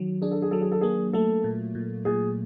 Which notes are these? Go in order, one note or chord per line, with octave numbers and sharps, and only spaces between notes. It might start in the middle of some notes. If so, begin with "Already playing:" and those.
Already playing: D#3 F#3
D4 G#4
A4
G#4
F#3 A4
G#4
A4
A#3 G#4
A3 A4
A#2
A#2
A#2 G#4